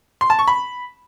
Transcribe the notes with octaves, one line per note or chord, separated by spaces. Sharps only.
C6
A5
C#6
B5